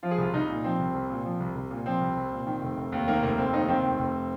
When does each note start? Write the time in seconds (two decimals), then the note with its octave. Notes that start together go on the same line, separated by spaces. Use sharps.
0.03 F3 F4
0.11 G#4
0.18 C2 F4
0.34 C2 D#4
0.49 A#2
0.64 F3 C4
0.79 C2
0.95 C2
1.10 A#2
1.25 F3
1.40 C2
1.55 C2
1.71 A#2
1.86 F3 C4
2.01 C2
2.16 C2
2.32 A#2
2.47 D#3
2.62 F1
2.77 F1
2.92 D#2
3.08 D#3 A#3
3.23 F1 A#3
3.38 F1 C4
3.53 D#2 D#4
3.68 D#3 C4
3.84 F1
3.99 F1